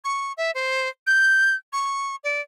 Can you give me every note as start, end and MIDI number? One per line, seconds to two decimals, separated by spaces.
0.04 0.32 85
0.37 0.51 76
0.55 0.88 72
1.07 1.55 91
1.73 2.16 85
2.24 2.41 74